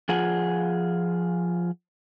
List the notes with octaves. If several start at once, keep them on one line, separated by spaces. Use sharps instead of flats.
F3 F4 G#4 F#5 G#5